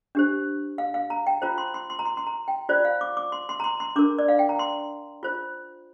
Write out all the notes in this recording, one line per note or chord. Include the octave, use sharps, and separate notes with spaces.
D4 G4 C5
F5
F5
A#5
G5
F4 C5 A#5
C6
C6
C6
A#5
C6
C6
A#5
G5
F4 C5 D5
F5
D6
D6
C6
C6
A#5
C6
C6
D4 A#4 D6
D5
F5
G5
A#5
C6
F4 C5